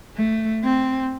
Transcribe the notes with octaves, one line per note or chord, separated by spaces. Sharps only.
A3
C4